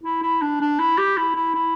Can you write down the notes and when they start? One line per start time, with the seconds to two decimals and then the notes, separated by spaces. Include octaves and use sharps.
0.04 E4
0.22 E4
0.42 D4
0.61 D4
0.79 E4
0.98 G4
1.17 E4
1.35 E4
1.54 E4